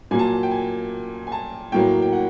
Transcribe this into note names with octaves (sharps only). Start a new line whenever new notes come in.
A#2 F#3 A#3 G#5
A5
G#5
G5
G#5
G#5
A5
A2 F#3 A#3 G5
G5
F#5